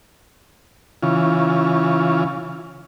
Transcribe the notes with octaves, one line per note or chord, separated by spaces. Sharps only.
C#3 E3 F4